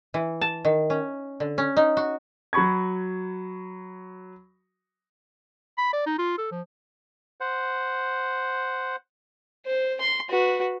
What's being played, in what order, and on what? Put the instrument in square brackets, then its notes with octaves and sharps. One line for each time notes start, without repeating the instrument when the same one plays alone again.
[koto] E3
A5
D#3
C#4
D3
C#4
D#4
F#4
[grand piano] F#3 F#4 B5 C#6 G#6
[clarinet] B5
D5
D#4
F4
A4
F3
[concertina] C5 F#5
[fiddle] C5
C6
F#4 B4